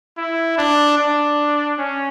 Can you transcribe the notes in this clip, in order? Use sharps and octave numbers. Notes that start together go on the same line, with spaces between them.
E4
D4
D4
C#4